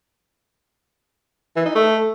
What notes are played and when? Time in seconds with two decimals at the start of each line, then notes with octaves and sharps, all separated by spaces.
1.56 E3
1.66 D#4
1.75 A3